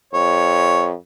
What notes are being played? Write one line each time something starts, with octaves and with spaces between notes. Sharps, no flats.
F2 C#5